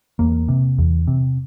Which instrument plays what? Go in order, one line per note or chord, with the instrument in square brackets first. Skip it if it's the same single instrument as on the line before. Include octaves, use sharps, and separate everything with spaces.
[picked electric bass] E2 A#3
C3
E2
C3